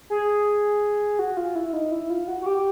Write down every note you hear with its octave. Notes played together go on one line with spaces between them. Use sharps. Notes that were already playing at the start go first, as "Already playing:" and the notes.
G#4
F#4
F4
E4
D#4
E4
F4
F#4
F#4
G4